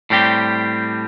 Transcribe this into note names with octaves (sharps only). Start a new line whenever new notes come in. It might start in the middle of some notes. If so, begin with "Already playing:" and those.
A2 G3 C4 G4